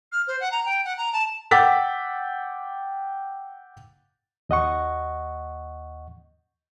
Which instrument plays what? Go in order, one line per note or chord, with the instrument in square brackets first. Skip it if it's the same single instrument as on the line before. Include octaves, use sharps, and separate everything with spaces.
[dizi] F6
C5
F#5
A#5
G5
F#5
A#5
A5
[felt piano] F#5 G5 D6 E6 A6 B6
[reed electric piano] D#2 D#5 F#5 C#6